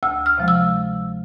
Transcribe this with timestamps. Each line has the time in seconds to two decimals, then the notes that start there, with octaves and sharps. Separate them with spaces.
0.03 D2 E6
0.26 F6
0.38 C3 F3 G#3
0.48 E6